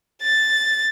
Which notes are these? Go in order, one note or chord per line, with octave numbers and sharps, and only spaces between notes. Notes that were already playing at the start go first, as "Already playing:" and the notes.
A6